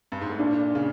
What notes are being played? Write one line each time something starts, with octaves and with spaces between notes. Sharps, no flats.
G2
G#2
A2
A#2 D4
C#3